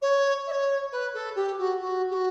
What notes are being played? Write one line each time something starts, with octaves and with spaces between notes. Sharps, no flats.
C#5
E5
C#5
B4
A4
G4
F#4
F#4
G4
F#4